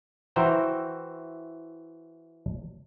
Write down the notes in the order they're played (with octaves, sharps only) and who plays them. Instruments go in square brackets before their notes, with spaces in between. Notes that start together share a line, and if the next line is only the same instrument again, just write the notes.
[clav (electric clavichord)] E3 F#4 C5 E5 G5 A#5